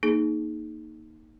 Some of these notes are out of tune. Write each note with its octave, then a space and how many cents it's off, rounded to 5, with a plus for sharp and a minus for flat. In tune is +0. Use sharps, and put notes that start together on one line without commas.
A#3 +0 D#4 +0 G#4 +25